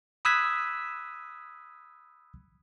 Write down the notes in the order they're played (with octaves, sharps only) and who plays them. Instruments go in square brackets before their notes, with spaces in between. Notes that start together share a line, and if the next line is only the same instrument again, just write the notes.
[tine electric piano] B5 D#6 E6 F#6 G#6 B6